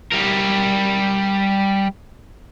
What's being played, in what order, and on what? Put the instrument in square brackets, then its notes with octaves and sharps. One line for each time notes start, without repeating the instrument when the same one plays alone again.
[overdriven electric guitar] G3 A#4